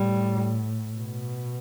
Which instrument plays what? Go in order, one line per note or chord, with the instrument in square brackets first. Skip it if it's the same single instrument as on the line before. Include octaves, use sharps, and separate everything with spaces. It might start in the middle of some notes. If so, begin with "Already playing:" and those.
Already playing: [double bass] A2 [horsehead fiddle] G3
[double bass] B2